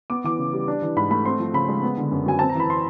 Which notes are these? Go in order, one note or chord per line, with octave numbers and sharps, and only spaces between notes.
B3 D6
E3 D6
C#3
G3
D4
E3
G#2 B5
A3 B5
C4 C6
F3
C#3 B5
G#3
B3
D3
F#2
F#3 G#5
C4 A5
A#5
E3 B5
C6